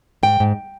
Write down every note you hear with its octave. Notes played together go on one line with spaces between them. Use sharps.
G#2 G5
G#2